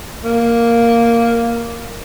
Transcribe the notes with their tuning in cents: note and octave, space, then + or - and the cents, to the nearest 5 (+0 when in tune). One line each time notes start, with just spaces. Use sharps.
A#3 +0